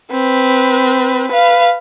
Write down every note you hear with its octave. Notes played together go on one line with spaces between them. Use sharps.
C4 B4
B4 F5